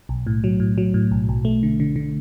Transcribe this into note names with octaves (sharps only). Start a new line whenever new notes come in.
B1
A2
F#3
A2
F#3
A2
B1
B1
A3
D3
D3
D3